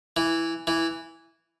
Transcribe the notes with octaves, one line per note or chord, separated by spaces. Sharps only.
E3
E3